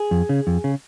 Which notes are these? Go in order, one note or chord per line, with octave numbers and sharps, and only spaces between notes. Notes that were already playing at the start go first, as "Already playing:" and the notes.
Already playing: G#4
F2
C#3
F2
C#3